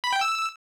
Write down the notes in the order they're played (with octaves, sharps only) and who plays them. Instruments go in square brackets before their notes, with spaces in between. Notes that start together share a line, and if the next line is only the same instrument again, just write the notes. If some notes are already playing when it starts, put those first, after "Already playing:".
[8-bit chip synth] B5
G5
E6